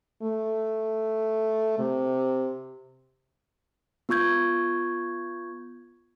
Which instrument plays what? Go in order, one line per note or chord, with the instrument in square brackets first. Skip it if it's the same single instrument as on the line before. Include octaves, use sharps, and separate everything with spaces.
[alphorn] A3
C3
[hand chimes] B3 F4 C#6 G6 G#6